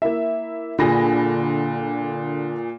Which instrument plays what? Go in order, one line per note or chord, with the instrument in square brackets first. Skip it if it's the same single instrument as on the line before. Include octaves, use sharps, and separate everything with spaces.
[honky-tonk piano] A#3 E4 E5
[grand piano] A#2 G#4 [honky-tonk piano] D3 B5 A#6